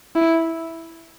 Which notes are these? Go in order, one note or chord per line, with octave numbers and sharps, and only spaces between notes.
E4